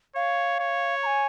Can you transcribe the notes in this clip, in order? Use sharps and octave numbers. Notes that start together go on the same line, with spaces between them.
C#5 F5
C#5
A#5
G#5